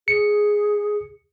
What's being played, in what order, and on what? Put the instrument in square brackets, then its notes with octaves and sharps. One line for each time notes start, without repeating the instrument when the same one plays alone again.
[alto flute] G#4 [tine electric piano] C#7